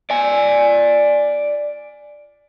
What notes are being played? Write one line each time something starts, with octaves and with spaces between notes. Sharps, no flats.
D5 G#5